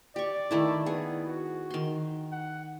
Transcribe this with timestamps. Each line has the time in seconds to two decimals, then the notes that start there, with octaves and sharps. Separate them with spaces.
0.16 G4 D5 C#6
0.51 D#3 A3 E4
0.86 B3 G#4
1.26 F#4
1.70 D#3 C6
2.32 F#5